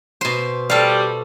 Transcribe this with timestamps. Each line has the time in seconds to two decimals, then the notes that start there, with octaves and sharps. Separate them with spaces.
0.21 B2 C5
0.70 G3 A4 F5